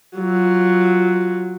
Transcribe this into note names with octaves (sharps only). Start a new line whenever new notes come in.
F#3 F4